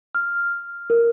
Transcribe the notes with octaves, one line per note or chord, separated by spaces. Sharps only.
F6
A#4